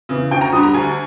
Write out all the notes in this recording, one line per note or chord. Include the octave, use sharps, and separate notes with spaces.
C#3 E3
D2 G5
A#5
D3 G3 D#6
A#5
D2 G#5